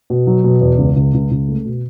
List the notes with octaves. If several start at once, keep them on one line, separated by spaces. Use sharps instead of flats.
B2
F#3
B2
E2
C#2
C#2
C#2
C#2
A3
B2